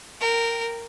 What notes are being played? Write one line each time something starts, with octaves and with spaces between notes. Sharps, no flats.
A#4 G5